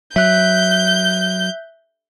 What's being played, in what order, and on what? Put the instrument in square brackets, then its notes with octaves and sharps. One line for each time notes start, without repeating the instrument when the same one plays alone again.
[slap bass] F#3 [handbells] E5 F#6 [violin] G6